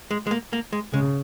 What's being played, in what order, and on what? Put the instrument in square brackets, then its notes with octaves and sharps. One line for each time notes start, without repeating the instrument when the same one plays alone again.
[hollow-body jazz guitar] G#3
G#3
A#3
A#3
G#3
[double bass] C#3 [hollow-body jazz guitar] G#3